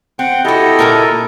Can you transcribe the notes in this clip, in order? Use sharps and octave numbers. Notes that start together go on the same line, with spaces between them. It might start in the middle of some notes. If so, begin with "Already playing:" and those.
C4 F#5 G5
E4 F#4 G4 A4 D#5
A#2 A#4 A5